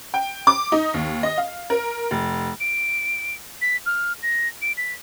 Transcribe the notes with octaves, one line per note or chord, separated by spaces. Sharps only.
G5
D6
D#4
D#2
D#5
F5
A#4
F1
D7
B6
F6
A#6
D7
B6